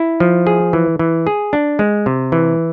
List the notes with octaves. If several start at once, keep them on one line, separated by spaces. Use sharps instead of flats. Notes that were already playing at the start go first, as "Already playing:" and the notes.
Already playing: E4
F3
G#4
E3
E3
G#4
D4
G#3
C3
E3